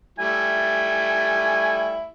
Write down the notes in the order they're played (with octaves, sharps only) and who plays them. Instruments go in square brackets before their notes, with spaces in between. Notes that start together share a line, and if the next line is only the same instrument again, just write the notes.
[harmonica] G3 A3 E4 [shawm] G#5